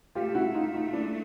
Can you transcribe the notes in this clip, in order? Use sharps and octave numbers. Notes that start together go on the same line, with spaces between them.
A3 F4 G4
E4 F#4
D#4 F4
D#4 F4
D4 E4